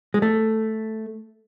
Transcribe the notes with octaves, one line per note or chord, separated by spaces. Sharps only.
G#3
A3